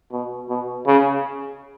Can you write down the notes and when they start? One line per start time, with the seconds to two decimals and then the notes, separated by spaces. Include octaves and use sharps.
0.12 B2
0.49 B2
0.86 C#3